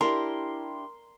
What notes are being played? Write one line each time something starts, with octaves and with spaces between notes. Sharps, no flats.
D4 E4 G4 A#4 C6